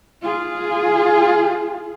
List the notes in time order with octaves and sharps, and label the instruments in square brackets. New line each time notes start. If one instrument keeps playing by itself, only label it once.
[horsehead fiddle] F4 G#4